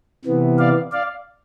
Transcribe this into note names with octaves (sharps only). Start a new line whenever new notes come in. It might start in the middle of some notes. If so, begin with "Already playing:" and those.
C3 E3 B3
D5 F5
D5 F5